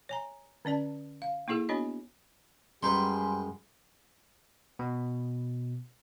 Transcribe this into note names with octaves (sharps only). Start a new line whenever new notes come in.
C#5 G#5 A#5
D3 C#4 D5 A5
F5
A#3 D#4 E4 G#4 A4
B3 D4 F#4 C#5 D#5
F#2 G3 G#3 B4 G5 C6
B2